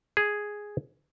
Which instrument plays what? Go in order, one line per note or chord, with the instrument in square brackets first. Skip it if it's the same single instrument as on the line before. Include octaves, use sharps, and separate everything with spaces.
[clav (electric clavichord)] G#4